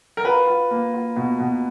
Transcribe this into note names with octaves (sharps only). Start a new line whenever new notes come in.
A#4
F4 B4
F4
A#3
F4
B2
B2